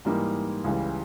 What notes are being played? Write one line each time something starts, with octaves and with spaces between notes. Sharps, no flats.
G#2 E3 G3 A#3 D#4
C#2 C#3 E3 G3